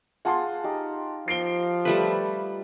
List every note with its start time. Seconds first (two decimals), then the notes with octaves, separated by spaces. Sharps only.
0.25 F4 G#4 F#5 A5 C6
0.64 D#4 G4
1.28 F3 C7 D7 G7
1.85 G3 A3 B4